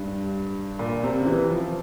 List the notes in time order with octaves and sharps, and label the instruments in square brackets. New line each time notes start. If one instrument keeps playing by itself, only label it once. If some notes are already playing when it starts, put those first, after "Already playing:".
Already playing: [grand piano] G2
A#2
C3
C#3
E3
F3